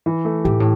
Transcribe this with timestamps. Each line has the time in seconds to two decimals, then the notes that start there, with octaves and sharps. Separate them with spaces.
0.06 E3
0.25 A3
0.44 A2 G4
0.60 A2